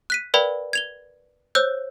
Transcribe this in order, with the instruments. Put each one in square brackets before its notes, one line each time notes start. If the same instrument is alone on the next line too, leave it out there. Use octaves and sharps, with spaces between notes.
[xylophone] F#6 B6 D#7
A#4 B4 D5 F5 G5 B5
G#6 F7 G7
C5 C#5 E6 F#6 G6